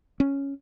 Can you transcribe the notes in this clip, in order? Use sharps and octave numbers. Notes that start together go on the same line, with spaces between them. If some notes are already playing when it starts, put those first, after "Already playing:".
C#4